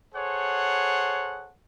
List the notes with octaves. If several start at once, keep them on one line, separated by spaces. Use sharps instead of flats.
G#4 A4 C5 C#5 F#5